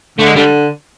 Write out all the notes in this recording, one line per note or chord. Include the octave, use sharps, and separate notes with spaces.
D3 A3
G#3
D3 G3